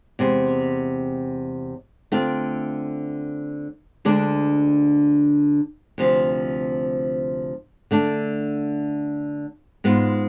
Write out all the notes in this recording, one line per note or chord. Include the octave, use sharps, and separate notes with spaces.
E2 C3 G#3
D3 A3 C4 F4
D2 D3 G#3 D4
D2 C3 F3
D3 A3 D4
G#2 G#3 B3 F4